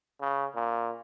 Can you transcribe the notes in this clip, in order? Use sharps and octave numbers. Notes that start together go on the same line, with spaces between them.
C#3
A#2